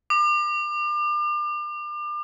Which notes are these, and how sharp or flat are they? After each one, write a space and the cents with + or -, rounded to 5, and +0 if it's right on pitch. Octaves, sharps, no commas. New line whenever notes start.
D6 +35